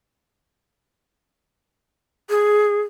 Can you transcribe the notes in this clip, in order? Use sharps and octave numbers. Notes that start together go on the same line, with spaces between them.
G#4